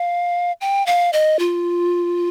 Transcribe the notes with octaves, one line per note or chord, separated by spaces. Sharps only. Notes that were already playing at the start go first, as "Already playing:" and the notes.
Already playing: F5
G5
F5
D#5
F4